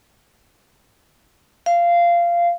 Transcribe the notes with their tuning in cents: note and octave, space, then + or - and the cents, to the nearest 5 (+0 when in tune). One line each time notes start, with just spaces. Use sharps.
F5 -15